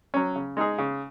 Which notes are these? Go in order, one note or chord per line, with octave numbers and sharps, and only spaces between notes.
F#3 C#4
C#3
G#3 D#4 G#4
C#3